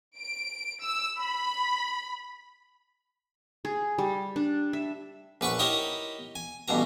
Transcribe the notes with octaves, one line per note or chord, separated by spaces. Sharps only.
D7
E6
B5
G#4
G3
D4
E5
A#1 B4 F#5 C#6
D#4 E4 G4 A#4 C#5 D#5
G#5
A1 G2 B2 A#5